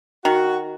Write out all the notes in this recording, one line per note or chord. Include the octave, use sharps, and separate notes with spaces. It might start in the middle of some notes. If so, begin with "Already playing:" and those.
D#3 F#4